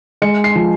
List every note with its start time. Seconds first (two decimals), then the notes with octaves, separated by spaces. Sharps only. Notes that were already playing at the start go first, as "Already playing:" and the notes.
0.22 G#3 C#7
0.44 C7
0.55 F3